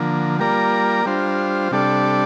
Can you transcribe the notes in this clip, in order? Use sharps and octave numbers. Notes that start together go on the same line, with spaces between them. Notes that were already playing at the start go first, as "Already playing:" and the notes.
Already playing: D3 F3 A#3
G3 A#3 F4 A#4 D5
G3 D4 F4 C5
C3 G3 D4 A4 D5